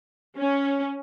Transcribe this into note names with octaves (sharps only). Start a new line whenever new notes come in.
C#4